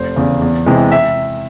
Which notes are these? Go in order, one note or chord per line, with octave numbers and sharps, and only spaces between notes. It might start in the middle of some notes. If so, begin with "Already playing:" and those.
Already playing: F1 C5
E2 C#3
E2
C3 E3 G#3
E5